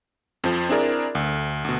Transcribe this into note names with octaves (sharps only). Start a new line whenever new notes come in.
F2 F3
C4 D4 E4 G#4 A#4 D5
D2
D2 B2